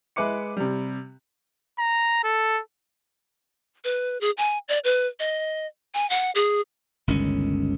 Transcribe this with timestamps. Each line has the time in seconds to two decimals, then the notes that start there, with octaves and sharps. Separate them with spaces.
0.16 G#3 B4 E5 D6 C#7
0.57 C3 G3
1.79 A#5
2.24 A4
3.84 B4
4.21 G#4
4.37 G#5
4.68 D5
4.84 B4
5.20 D#5
5.94 G#5
6.10 F#5
6.35 G#4
7.08 G1 C#2 D#3 C#4